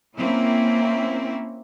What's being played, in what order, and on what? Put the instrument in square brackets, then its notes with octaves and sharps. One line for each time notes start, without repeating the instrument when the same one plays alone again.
[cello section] A#3 C4 C#4 E4